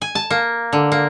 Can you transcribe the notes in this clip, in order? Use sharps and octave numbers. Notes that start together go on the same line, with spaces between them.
G#5
A5
A#3
D3
A#3